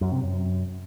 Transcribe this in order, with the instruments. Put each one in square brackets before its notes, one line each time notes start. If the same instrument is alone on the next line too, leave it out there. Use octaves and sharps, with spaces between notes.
[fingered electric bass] F#2
C3
F#2